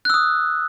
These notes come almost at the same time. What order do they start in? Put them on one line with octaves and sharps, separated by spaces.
F#6 E6 D#6